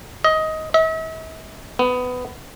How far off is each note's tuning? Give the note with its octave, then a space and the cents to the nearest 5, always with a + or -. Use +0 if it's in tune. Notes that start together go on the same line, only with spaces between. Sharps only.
D#5 +15
E5 -45
B3 +15